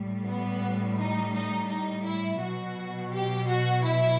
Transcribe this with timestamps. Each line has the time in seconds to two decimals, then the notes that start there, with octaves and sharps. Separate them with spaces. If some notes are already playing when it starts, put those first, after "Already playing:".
Already playing: A2 G3
0.26 B3
0.98 D#4
1.34 D#4
1.69 D#4
2.05 E4
2.40 B2 F#3 F#4
3.12 G4
3.48 F#4
3.83 E4